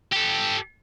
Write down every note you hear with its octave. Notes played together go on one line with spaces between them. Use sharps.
G4 A4